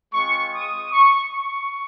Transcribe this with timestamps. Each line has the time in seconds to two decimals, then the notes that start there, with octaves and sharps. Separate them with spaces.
0.12 G#3 C4 F4 C#6
0.53 D#6
0.92 C#6
1.32 C#6